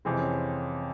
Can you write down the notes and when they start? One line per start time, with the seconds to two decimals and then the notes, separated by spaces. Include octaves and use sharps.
0.05 F2 C3 E3 G#3 C4
0.19 C#4